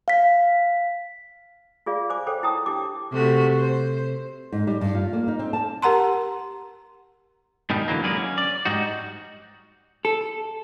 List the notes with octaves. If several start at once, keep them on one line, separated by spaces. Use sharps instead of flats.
F5 B6
F4 G#4 D5 F5
C5 G#5 D6
A4 C5 C#5 G5
E4 G5 A5 A#5 D#6
D4 E4 G4 D6
C3 A3 F#4
C5
G#2
G3
G2
F4
A#3
D#4
C4
A5
G4 A#4 F#5 A#5 C6
G#2 B2 D#3 G3
D3 E3 F#3 A#3
F#3 G#3 A#3 B3 B4 D5
C#4
D5
G#2 G3 D#4 F#4
A4